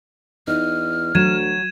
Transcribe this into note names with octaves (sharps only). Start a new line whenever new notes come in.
E2 D#4 F6
D2 F#3 G#6 D#7 E7